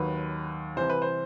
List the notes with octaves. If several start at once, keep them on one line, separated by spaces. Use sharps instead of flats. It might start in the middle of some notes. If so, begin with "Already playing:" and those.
Already playing: D#2 D#3 F#3 B4
C2 C3 E3 C5
B4
C5